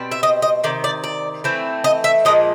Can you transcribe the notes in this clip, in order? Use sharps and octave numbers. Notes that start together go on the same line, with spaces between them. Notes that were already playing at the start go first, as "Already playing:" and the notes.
Already playing: B2 G3 C4
E5
D#5
D#5
C3 D#3 D5
D5
D5
E3 A3 C4
D#5
E5
A#2 F3 G#3 D#5